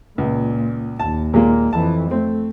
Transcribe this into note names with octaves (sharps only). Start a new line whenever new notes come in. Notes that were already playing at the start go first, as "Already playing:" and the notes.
C#2 A#2
D#2 A5
A#2 G#3 A#3
F2 E3 A5
A3 C4